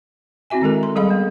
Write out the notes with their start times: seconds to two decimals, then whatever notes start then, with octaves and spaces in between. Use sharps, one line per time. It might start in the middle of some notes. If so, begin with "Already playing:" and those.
0.50 C4 E4 F#4 E5 G#5
0.62 D#3 G#3 A4 A#4
0.83 C6
0.96 G3 G#4 A4 D#5 F5 B5
1.10 B3